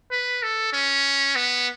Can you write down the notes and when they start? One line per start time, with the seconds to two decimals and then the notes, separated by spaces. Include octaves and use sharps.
0.11 B4
0.43 A4
0.73 C#4
1.35 B3